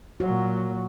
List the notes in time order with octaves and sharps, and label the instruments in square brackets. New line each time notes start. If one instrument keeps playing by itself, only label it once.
[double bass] A#2 F#3 [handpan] F#4